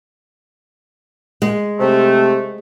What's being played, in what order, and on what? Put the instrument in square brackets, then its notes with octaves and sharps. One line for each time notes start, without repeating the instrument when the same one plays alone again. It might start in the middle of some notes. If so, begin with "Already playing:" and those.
[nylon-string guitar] G#3
[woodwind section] C3 A3